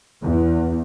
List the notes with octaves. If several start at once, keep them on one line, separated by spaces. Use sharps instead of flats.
E2